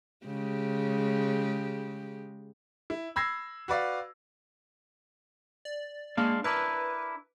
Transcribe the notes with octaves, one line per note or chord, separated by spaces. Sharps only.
C#3 G#3 G4
E4
B5 E6 G#6 A#6 C7
F#4 B4 D5 F5
D5
G#3 A#3 D4 F5
D4 E4 A#4 B4